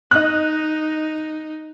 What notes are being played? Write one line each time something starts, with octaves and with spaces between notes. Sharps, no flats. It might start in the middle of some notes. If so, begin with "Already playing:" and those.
D#4 D#5 F#6